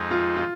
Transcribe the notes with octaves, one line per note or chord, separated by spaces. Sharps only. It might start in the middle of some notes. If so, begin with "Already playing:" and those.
Already playing: F2 F3 G#3 D#4
F4
F4